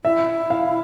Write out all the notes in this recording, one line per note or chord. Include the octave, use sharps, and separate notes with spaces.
E4 E5
F5